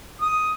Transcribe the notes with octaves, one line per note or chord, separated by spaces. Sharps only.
D#6